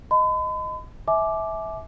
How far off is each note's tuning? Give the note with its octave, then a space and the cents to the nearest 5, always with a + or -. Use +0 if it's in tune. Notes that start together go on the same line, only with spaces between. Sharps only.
D#5 +0 B5 +45
E5 -20 G#5 +40 D6 +0